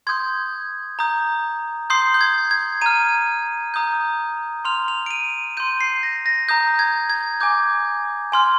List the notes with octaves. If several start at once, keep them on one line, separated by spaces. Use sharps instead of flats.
C6 D#6 G6 G#6
A#5 D#6 G6
C6 D#6 G6 C7
G6
G#6
G#6
A#5 F6 D#7
A#5 D#6 G6
C6 F6 F7
F7
D7
D#7
C6 G6 D#7
C7
A#6
A#6
A#5 D#6 G6
G#6
G#6
G#5 D6 G6
G#5 C6 F6